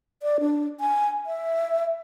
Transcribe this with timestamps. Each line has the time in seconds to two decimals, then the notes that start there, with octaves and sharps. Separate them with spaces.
0.22 D5
0.40 D4
0.80 G#5
1.26 E5